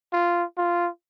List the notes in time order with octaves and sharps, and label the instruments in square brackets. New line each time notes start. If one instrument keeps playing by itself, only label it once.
[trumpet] F4
F4